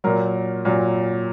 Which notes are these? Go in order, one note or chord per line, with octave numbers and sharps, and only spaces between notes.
A#2 F#3 A#4
A#2 F#3